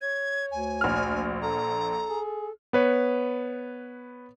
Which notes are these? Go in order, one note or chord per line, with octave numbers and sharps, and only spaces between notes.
C#5 G#6
D2 G#5
A#1 F6
A4 A#5
G#4
B3 B4 C#5